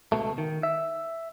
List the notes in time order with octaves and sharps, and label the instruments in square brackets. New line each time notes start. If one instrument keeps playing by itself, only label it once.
[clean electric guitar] C#2 B2 A3
D#3
E5